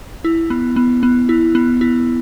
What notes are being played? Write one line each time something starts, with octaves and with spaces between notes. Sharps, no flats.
E4
B3
B3
B3
E4
B3
E4